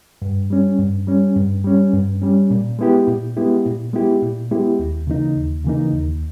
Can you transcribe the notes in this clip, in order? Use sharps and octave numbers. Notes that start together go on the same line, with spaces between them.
G2
G3 C#4
G2
G3 C#4
G2
G3 C#4
G2
G3 C#4
A#2
G#3 B3 E4 G4
A#2
G#3 B3 E4 G4
A#2
G#3 B3 E4 G4
A#2
G#3 B3 E4 G4
D#2
C#3 E3 A#3 D#4
D#2
C#3 E3 A#3 D#4
D#2